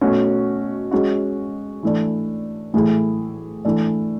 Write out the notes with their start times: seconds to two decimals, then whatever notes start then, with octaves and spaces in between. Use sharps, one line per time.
0.01 B2 A3 C#4 F#4
0.91 G#3 C#4 F#4
1.83 E3 A3 D4
2.74 A2 E3 A3 E4 G#4
3.65 E3 A3 D4